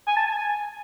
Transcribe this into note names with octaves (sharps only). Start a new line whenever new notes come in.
G#5
A5
G#5